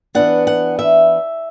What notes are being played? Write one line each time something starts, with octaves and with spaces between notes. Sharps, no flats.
E3 B3 D4 F#5
F#5
E5